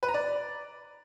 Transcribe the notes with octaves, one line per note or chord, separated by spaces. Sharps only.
B4
A#5
D5